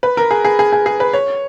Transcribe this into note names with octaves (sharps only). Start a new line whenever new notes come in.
B4
A#4
G#4
G#4
G#4
G#4
G#4
B4
C#5